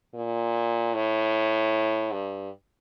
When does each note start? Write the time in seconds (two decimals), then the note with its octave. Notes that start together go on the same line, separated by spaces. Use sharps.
0.14 A#2
0.94 A2
2.13 G2